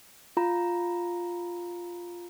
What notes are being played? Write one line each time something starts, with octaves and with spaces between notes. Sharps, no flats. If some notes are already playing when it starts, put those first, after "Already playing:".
F4 A#5